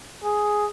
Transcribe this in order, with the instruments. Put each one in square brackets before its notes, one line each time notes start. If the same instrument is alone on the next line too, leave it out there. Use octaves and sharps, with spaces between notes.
[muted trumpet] G#4